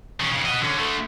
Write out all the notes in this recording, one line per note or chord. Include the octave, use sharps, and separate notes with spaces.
D#3 C#4
F2 C#3
F#4 D#5
D3 C#4
D3 A3